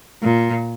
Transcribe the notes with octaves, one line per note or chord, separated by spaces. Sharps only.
A#2